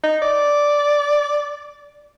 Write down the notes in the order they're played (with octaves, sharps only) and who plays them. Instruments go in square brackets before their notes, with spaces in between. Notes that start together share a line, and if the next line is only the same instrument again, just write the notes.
[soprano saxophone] D#4
D5